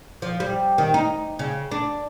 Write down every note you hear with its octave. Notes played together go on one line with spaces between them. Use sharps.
F3
G3
D#3
D#4
C#3
D4